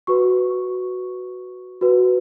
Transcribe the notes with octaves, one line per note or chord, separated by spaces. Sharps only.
F#4 B4 C#6
F#4 B4